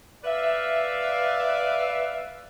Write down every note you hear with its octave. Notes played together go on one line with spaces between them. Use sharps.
B4 D5 E5 F5